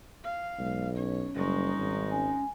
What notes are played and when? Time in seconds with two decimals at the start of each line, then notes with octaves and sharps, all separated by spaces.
0.24 F5
0.58 B1 G#3
0.96 C#4 C#5
1.35 F#1 G3 G#3 D#4 C#6
1.77 G#1
2.11 C#4 G#5